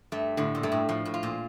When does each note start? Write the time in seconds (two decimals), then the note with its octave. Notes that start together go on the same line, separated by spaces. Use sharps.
0.12 G2 A3
0.37 A2 D3
0.55 A#2
0.63 G2 A3
0.72 A2
0.89 A2 F3
1.05 A2
1.14 F4
1.23 A#2